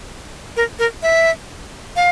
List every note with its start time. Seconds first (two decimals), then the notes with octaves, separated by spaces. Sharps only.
0.56 A#4
0.79 A#4
1.03 E5
1.96 F5